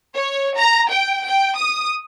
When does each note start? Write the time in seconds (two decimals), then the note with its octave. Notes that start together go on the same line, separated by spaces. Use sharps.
0.15 C#5
0.57 A#5
0.90 G5
1.26 G5
1.57 D#6